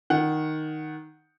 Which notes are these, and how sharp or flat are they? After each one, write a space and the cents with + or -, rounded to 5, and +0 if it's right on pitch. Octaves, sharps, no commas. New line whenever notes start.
D#3 +0 F#5 +0